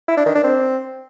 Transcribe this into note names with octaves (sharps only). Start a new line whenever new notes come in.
E4
D4
D#3
D4
C4